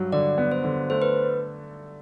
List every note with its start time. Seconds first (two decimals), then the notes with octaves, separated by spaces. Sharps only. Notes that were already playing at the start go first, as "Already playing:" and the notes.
Already playing: G2 F#3
0.12 D3 D5
0.38 B3
0.52 C5
0.64 D3
0.90 A3 C5
1.02 B4